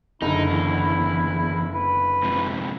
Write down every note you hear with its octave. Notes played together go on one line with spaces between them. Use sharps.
F#1 D3 D#4 E4
E2
B4
G#2 C3 F3